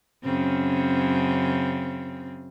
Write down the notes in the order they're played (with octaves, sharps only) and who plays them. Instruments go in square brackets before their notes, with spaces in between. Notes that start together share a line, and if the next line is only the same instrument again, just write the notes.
[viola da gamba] F#2 C#3 C4